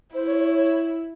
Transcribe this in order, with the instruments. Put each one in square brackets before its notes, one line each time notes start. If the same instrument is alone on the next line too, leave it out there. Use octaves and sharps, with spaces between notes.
[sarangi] E4 [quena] C5
[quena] C#5
C#5
C#5